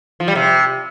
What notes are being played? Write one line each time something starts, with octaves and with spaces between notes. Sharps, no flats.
F3
G3
C3